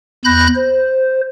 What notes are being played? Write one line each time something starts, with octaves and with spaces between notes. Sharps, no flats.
E2 B5 F#6 G6 A#6
C5